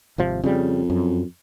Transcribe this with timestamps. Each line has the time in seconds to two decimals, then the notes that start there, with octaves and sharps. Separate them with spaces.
0.18 G#1 C3 F3
0.44 F2 C#3 G3
0.90 F#2